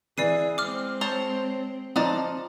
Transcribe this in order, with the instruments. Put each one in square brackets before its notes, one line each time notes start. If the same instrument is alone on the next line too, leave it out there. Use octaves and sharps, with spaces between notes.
[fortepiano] E3 [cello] G#4 [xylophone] D5 C7 D#7
[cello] G#3 C4 [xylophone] D6 F6
[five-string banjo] C5 C#5 A5 [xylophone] F7
[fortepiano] F3 [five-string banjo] D#4 D5 A5